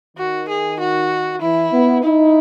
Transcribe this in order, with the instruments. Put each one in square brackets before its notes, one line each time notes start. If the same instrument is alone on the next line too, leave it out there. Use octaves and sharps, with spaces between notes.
[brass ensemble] D#3 [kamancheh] F#4
[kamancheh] G#4
F#4
[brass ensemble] E3 [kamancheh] E4
[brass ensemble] B3
[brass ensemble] D#4 [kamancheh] E4